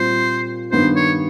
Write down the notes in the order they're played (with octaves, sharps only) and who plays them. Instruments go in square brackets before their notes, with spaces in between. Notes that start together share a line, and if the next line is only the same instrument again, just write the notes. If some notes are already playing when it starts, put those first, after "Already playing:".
Already playing: [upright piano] A#2 G3 C4 F4 [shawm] C5
[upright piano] G2 D#3 G3 B3 D4 [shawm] C5
[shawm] C#5